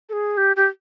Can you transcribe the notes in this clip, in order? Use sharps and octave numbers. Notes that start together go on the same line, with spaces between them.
A4
G#4
G4
G4